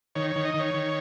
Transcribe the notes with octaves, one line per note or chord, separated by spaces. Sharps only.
D#3 C#5
C#5
D#3
D#5
D#3
C#5
D#3